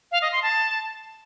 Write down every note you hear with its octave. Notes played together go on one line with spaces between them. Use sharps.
F5
D#5
C6
A5